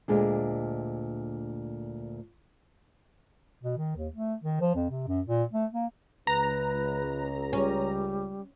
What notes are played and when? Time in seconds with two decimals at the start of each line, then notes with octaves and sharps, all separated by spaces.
0.08 D2 A#2 G#3 D4
3.63 B2
3.77 D#3
3.96 D#2
4.15 A3
4.44 D#3
4.61 F3
4.75 F2
4.90 C3
5.07 F#2
5.26 A#2
5.53 A3
5.73 A#3
6.27 C#2 B4 A#5
7.53 G3 C#4